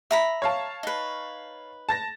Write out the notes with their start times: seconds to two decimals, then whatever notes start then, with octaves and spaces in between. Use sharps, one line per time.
0.11 E5 A#5 B5
0.42 C#5 F5 A5
0.83 D#4 B4
1.89 A5 A6 A#6